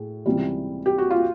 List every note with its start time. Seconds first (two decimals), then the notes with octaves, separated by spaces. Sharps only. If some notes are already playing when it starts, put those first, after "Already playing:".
Already playing: A2 G#4
0.26 C#2 C3 E3 G3
0.86 G4
0.98 F#4
1.11 F4